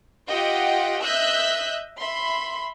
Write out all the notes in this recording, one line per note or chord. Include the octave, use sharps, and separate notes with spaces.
F4 G4 D#5 F#5 G5
D#5 E5 E6 F#6 G6 B6
E5 B5 C6